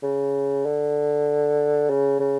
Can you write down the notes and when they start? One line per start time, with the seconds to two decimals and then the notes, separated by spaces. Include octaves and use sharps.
0.03 C#3
0.65 D3
1.90 C#3
2.20 C#3